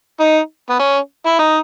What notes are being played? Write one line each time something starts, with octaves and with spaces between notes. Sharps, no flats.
D#4
B3
C#4
E4
D#4